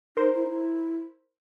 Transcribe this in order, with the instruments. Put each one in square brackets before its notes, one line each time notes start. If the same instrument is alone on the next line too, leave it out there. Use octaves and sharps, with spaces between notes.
[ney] D#4 [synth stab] A#4 C5
[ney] E4
D#4
E4